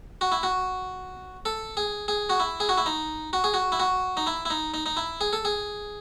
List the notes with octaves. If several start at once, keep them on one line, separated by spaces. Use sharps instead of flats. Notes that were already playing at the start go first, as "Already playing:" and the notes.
F#4
E4
F#4
A4
G#4
G#4
F#4
E4
G#4
F#4
E4
D#4
F#4
G#4
F#4
E4
F#4
D#4
E4
E4
D#4
D#4
D#4
E4
G#4
A4
G#4